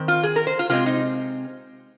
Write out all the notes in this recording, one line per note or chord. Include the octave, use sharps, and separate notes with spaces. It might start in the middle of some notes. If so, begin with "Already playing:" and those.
Already playing: D#3 C4
F4
G#4
A#4
C5
F4
C3 G#3 C4 F4
D#4